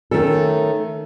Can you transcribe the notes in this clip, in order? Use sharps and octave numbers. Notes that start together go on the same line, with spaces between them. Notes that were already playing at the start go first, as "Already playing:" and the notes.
D#3 A3 C#4 A4